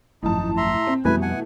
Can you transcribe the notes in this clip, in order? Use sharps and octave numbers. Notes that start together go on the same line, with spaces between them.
G#1 F#2 A2 F3 D#4 A5
E5 A#5 C6
C4
F2 B2 E3 G3 A3 B4 G#5
F#5 G#5